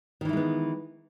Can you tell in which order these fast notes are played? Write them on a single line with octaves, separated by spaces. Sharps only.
D#3 E3 E4 G#3 B3